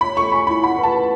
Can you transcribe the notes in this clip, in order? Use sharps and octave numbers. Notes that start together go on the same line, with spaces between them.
C#5 B5
A4 C#6
G#5 B5
E4 B5
F#5 B5
B4 A5
F#4